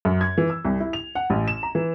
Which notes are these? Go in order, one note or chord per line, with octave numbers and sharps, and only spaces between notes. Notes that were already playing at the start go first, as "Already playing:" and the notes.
F#2
G#6
E3
E6
C2
E4
F7
F#5
A1
E7
A#5
E3